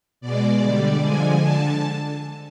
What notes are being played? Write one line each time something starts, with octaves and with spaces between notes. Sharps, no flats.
B2 G#3 D5
D3 G3
D3 F3 G#3 G#5
D3 A5